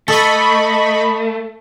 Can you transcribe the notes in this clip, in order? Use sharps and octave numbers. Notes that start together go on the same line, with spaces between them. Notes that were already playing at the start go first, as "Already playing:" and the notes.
A3 A4 D#5 B5 C#6